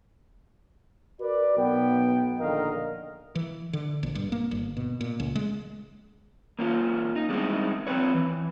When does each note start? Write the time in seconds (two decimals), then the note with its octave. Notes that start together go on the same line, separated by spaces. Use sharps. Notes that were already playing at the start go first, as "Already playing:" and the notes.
1.20 F#4 A#4 B4 D5
1.57 B1 B3 G5
2.40 A#1 D3 D#3 A#4 D#5 F5
3.35 E3
3.73 D3
4.03 A#1
4.15 G2
4.32 A#3
4.51 G1
4.77 B2
5.01 A#2
5.20 C#2
5.35 G#3
6.59 A#3 C#4 F4
7.16 D#4
7.29 G3 G#3 C4 C#4 D#4 E4
7.87 F3 G#3 C4 B4 C#5
8.14 E3